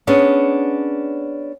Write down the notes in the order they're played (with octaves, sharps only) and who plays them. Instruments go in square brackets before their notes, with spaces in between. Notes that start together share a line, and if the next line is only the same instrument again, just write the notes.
[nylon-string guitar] B3 C#4 D4 G#4